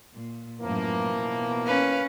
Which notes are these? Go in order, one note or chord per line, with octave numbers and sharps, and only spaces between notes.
A#2
F#2 A2 E3 F3 A#3
B2
C#4 B4 F5